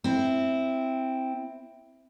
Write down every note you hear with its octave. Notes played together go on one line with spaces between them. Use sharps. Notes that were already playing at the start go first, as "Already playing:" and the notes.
C4 E4